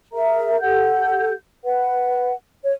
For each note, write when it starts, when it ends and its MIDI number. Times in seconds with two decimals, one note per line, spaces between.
0.13 0.60 68
0.13 0.60 70
0.13 0.60 76
0.13 0.60 82
0.61 1.31 67
0.61 1.31 69
0.61 1.31 78
0.61 1.31 91
1.64 2.33 71
1.64 2.33 78
2.64 2.72 73